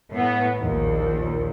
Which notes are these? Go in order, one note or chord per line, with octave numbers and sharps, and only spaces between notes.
A2 B3
A#1 D#2